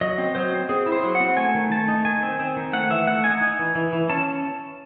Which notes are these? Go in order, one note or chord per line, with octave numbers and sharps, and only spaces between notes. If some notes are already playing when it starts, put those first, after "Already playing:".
F#3 D#5
C4
F#3 C5
C4
C4 G#4
E4
C5
F#3
F#5
C4
A3 G#5
D#3
A3 A5
D#4
D#3 G#5
C4
C4
D#3
A3 F#5
E3 E5
A3 F#5
D#4 G#5
D#4
E3
E3
E3
C#4 A5